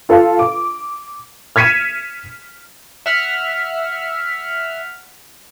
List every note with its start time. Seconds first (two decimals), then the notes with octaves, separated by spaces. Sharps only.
0.09 F4 A4 F5
0.39 D6
1.56 F6 G#6 B6 C#7 D#7 E7
3.06 E5 F#5 F6